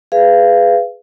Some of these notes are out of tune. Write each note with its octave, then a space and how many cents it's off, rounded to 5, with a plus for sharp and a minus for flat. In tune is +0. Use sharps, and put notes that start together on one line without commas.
G#4 +0 B4 +15 F5 -25